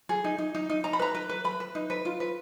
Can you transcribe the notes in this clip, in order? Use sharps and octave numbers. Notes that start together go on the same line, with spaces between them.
G#4
D#4
D#4
D#4
D#4
D#4 A#5
B5
B4 A#5
B4
B4
B4 B5
B4
D#4
B4
F4
B4